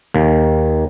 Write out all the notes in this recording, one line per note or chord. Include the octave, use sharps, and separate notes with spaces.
D#2